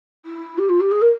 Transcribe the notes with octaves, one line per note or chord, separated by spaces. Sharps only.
E4
G4
F4
G4
G#4
A#4